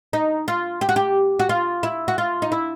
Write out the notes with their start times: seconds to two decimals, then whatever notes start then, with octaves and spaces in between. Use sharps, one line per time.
0.13 D#4
0.48 F4
0.81 G4
0.89 F#4
0.96 G4
1.39 F#4
1.49 F4
1.83 E4
2.08 F#4
2.18 F4
2.42 D#4
2.52 E4